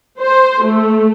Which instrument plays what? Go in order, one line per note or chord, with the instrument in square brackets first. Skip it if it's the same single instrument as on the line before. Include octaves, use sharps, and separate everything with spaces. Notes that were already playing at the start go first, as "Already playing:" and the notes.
[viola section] C5
A3